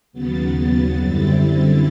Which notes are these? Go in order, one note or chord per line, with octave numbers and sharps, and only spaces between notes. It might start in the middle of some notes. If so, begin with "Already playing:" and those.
D#2 C#3 F#3 B3 A6
F#2 D3 G3 C4 E4